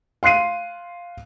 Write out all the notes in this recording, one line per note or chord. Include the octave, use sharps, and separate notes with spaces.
F5 C6 F#6 C7 D#7